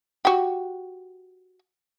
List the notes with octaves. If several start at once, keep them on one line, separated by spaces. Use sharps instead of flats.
F#4 G4